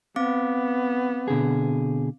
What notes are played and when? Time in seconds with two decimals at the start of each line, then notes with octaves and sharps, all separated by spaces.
0.16 B3 C4 F5 D6
1.28 B2 D3 G#4